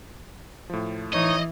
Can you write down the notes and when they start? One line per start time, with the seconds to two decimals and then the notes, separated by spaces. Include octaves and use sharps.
0.70 A2 F3
1.13 E3 D#4 C#5 D#5